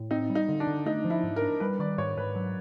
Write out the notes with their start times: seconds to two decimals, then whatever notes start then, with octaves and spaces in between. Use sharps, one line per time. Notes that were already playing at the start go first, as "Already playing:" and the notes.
Already playing: A2
0.11 C4 D#4
0.30 G3
0.35 D#4
0.49 D3
0.60 D4
0.67 D3
0.86 A3 D#4
1.04 F3
1.10 E4
1.23 G#2
1.36 A#4
1.42 D4
1.60 G3 B4
1.79 D#3 D5
1.98 G#2 C#5
2.17 G#2 B4
2.35 F#3